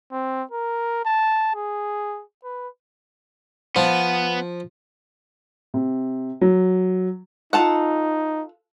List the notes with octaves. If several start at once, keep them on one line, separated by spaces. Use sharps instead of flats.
C4
A#4
A5
G#4
B4
F3 B3
C3
F#3
D#4 F4 A4 F#5